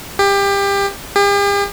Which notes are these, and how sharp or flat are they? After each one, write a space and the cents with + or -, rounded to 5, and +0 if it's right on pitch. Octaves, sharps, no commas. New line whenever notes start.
G4 +25
G4 +45